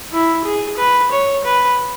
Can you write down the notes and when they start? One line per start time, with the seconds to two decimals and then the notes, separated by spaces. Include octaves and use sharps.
0.12 E4
0.45 G#4
0.78 B4
1.12 C#5
1.44 B4